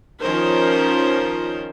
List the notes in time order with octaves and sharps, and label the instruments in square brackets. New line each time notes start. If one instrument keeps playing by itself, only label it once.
[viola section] D#3 F3 C#4 D#4 A#4 C5